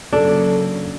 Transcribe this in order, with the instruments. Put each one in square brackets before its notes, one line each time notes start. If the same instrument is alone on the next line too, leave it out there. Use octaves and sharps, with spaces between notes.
[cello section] C#3 F#3 A#3 [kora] D4 [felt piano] A4